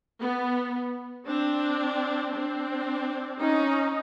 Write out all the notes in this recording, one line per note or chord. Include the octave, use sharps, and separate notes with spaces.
B3
C4 D4
C4 D4
C#4 D#4